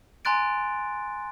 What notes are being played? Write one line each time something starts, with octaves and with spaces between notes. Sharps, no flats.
G#5 A#5 C6 F#6 A6 D7